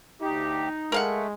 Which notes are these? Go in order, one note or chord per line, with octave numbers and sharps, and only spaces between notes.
D2 D#4 G4
G#3 A3 A#4 F5 F#5